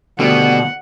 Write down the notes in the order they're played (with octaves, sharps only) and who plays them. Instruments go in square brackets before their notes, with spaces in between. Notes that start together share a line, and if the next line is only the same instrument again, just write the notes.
[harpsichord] D2 G3 [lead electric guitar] B2 [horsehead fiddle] F#5